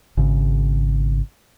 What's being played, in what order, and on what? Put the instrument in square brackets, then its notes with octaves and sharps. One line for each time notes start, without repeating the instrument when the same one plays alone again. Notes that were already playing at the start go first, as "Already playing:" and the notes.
[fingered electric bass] G#1 C#3